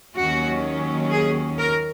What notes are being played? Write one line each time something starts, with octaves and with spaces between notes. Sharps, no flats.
D#2 D#3 F#3 C#4 F#4
G#4
A#4